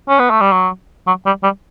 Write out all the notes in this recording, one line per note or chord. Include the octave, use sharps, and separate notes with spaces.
C#4
B3
A3
G3
F#3
F#3
G3
G3